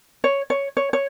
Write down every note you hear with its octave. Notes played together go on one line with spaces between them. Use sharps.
C#5
C#5
C#5
C#5